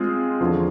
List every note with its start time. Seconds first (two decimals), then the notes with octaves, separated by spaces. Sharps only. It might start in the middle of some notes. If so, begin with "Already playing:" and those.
Already playing: G#3 C4 F4 G#4
0.41 E2 D3 F3